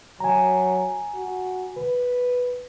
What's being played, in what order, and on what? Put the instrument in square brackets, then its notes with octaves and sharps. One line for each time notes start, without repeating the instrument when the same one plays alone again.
[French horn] F#3 [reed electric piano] G#5 A#5
[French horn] F#4
B4